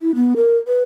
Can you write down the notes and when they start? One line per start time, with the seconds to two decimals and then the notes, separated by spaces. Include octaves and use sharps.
0.01 E4
0.15 B3
0.36 A#4
0.67 B4